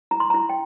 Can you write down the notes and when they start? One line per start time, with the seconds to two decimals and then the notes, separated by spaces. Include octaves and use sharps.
0.11 E4 A#5
0.20 C6
0.30 A#5
0.34 E4
0.49 G5